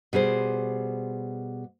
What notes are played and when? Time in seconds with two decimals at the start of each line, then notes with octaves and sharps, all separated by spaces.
0.13 B2 G3 G#4 C5